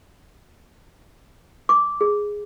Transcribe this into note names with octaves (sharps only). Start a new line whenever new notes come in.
D6
G#4